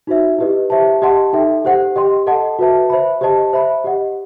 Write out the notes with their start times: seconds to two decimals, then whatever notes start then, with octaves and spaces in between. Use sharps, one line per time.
0.07 D#4 F#4 C5 E5
0.38 E4 G4 B4 D#5
0.70 G4 C5 E5 A5
1.02 G4 D#5 F#5 A5 C6
1.33 D#4 A4 E5 G5
1.65 G4 C5 F#5
1.96 G4 D#5 G5 C6
2.27 A4 D#5 F#5 A5
2.59 F#4 B4 E5 A5
2.90 C5 E5 B5
3.21 G4 C5 D#5 A5
3.53 C5 E5 B5
3.84 G4 D#5 F#5